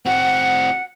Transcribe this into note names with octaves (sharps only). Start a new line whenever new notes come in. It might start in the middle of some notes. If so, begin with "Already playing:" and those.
C4 F#4 F#5